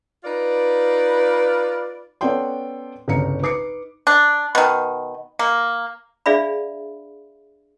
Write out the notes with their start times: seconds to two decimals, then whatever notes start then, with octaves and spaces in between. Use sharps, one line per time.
0.24 D#4 F4 B4 D5
2.21 B3 C#4 A4 D5 G5 C6
3.08 G1 C2 C#3 A#5 C#7
3.42 D#4 B4 D6 C7 C#7
4.07 D4
4.55 B2 D#3
5.39 A#3
6.26 D4 G#4 D5 E5 F5 B5